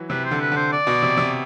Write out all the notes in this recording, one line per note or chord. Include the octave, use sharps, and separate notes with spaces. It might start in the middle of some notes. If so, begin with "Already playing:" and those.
Already playing: E3 F#3
C3 B4
C5
D3
B4
D3 C5
D5
B2
C3
C3